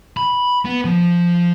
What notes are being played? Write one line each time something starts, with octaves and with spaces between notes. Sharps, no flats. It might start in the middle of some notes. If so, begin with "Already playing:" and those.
B5
B3
F3